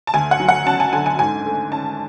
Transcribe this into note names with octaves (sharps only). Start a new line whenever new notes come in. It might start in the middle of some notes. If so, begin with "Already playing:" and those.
A5
D2 G#5
F#5
F#3
F#5
C#4 A5
G#5
D3 G#5
G#5
G#2 G#5
A3
C#4 A5